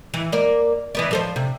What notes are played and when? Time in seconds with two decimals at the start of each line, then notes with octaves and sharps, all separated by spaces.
0.14 E3
0.32 A#3 D5
0.95 E3 B3 D5
1.11 F3 A4 C5
1.36 C3